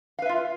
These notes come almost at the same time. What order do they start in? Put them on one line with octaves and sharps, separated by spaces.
F5 B4 E5 F4